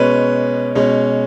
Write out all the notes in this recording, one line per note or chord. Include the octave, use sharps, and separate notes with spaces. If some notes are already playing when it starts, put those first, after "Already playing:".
Already playing: B2 G#3 C#4 B4
B2 G#3 C#4